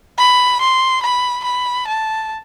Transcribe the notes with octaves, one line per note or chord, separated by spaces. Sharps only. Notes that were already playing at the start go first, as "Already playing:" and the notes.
B5
C6
B5
B5
A5